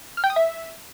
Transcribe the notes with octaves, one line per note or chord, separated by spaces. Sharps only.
F6
G5
D#6
E5